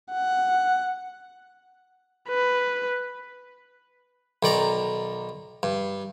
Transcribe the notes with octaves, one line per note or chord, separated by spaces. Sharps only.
F#5
B4
B1 D#3 D5 A#5
G2